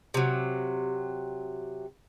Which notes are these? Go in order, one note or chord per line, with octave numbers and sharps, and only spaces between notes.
C3 F#3